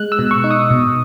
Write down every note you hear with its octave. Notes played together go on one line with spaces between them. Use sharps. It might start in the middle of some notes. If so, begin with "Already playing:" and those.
Already playing: G#3 F#6
E6
B2
C#6
D#4
D#6
B2